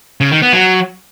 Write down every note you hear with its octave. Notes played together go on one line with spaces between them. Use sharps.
C#3
D#3
B3
F#3